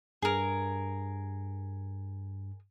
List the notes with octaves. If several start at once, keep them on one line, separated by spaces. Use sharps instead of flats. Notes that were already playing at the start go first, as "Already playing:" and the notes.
G2 G#4 A#4